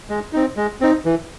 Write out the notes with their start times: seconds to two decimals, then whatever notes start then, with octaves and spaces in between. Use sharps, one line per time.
0.09 G#3
0.33 C4 D#4
0.57 G#3
0.81 C4 D#4
1.05 E3